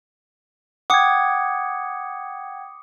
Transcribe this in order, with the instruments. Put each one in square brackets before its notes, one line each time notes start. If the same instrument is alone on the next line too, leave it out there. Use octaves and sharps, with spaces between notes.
[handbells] F#5 G5 G#6 [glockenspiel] D6 D#6 C#7